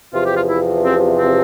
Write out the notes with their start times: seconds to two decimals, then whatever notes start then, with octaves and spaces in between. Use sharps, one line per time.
0.13 E2 C3 F3 F4
0.25 G4
0.36 F4
0.48 E4
0.84 C4
1.18 C4